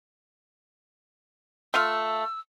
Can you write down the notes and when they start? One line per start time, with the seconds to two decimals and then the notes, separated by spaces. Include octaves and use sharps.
1.74 A3 F4 F5 E6